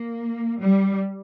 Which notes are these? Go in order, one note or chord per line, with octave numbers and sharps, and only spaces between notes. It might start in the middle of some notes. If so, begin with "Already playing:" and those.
Already playing: A#3
G3